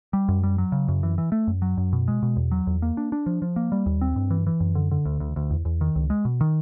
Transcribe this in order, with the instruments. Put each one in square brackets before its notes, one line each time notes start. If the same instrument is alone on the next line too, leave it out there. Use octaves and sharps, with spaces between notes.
[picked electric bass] G3
F#2
G3
F#3
C#3
F#2
E3
E3
A3
F#2
F#3
F#2
B2
G#3
B2
E2
F#3
E2
A#3
D4
D4
F3
F3
A#3
G3
D#2
C4
G2
E3
E3
F#2
D3
D3
D2
D2
D2
E2
E2
D#3
C#2
G#3
B2
D#3